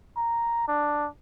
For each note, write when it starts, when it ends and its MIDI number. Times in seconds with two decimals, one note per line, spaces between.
0.17 0.66 82
0.68 1.07 62